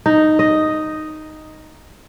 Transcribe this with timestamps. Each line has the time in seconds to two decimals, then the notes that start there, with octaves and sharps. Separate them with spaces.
0.06 D#4
0.39 D#5